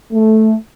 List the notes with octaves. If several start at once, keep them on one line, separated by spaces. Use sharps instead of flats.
A3